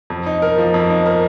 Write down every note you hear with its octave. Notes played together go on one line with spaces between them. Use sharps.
F2
D#4
A#4
F3
F2
D#4
A#4